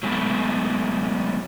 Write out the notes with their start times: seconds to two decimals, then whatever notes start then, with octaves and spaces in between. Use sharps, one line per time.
0.03 F#3 G#3 A3 B3